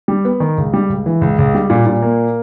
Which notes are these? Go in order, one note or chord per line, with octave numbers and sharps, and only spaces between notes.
G3
B3
D#3
C#2
G3
C#2
E3
C#2
C#2
G3
A#2
A#2
A#3